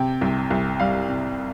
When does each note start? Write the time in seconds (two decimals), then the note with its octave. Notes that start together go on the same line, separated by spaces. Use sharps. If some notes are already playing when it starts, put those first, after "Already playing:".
Already playing: C3 G5
0.21 C2
0.50 C2
0.79 G3 F5
1.08 C3